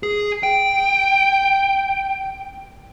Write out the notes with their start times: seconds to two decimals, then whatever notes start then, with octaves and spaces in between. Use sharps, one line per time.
0.03 G#4
0.43 G5